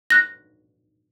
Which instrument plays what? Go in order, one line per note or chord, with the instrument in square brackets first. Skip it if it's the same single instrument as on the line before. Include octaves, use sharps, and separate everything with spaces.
[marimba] F#6 A#6